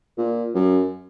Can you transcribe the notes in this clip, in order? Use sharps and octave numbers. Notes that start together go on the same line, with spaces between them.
A#2
F#2